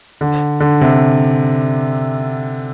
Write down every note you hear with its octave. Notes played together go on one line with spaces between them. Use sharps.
D3
D3
C3